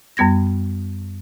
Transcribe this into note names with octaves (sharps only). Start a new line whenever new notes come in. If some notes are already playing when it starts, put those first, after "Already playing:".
F#2 G3 B3 G#6 A#6